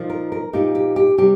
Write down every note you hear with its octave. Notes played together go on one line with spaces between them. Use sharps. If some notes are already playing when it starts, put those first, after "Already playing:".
Already playing: A#2 F3 A#3 D#4
A#4
A#4
A#2 F3 A#3 D#4 G4
G4
G4
C3 G3 C4 G4